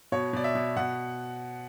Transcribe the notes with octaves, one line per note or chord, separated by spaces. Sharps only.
B2 C#5
B2 D5
E5
B2
B2 F#5